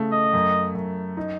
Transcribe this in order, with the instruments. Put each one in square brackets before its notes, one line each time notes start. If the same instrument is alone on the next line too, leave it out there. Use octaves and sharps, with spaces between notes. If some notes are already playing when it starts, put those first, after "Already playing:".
Already playing: [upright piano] C#3 A3
[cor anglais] D#5
[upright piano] F#2
F#2
D#4